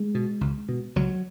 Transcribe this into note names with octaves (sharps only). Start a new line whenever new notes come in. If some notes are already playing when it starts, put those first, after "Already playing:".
Already playing: G#3
B2
C#2
B2
C#2 F#3